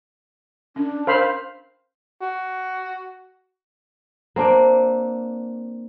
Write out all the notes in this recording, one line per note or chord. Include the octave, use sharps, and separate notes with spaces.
C#4 D4
A#4 C5 F5 B5
F#4
A#3 C4 D4